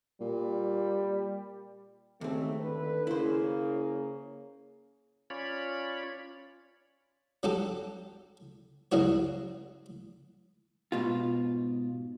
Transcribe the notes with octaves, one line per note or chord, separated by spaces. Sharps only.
A#2 G3
D#2 G#2 C#3 A3 C4
D3 B4
C#3 A#3 E4 C5
C#4 F4 C#5 D5 B5
F#3 C#4 F#4 G4 A4
C#2 F#2 C#3 E4 F#4 C#5
G#2 B2 F4